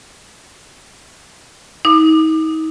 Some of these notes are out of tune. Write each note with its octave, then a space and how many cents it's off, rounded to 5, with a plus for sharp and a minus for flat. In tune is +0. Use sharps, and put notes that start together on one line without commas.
D#4 +35 D6 +35